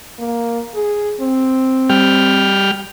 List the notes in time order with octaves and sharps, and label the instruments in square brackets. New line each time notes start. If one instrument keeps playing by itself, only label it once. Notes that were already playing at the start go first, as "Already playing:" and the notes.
[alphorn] A#3
G#4
C4
[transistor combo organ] G3 G5 F6